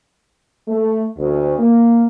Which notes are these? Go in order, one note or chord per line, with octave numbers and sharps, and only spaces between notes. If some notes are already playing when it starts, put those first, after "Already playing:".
A3
D2
A#3